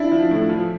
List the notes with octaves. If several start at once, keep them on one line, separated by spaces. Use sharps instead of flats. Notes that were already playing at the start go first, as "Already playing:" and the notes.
Already playing: D4 E4
F3
A2
F3